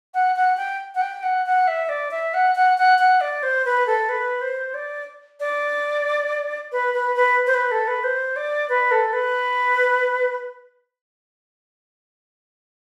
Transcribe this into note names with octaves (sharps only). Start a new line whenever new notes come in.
F#5
F#5
G5
F#5
G5
F#5
F#5
E5
D5
E5
F#5
F#5
F#5
F#5
D5
C5
B4
A4
B4
C5
D5
D5
B4
B4
B4
C5
B4
A4
B4
C5
D5
B4
A4
B4